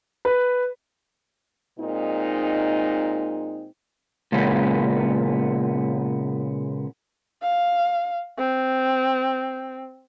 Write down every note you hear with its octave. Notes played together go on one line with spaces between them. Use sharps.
B4
A#2 G#3 C4 D#4
A#2 C#3 G#3 B3
F5
C4